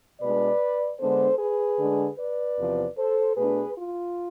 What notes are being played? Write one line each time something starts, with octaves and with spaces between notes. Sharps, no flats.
B2 G#3 D4 B4 D5
D3 G#3 B3 D4 A4 C5
G#4 B4
D3 G#3 D4
B4 D5
E2 C3 F3
A4 C5
B2 A3 D4 G#4 B4
F4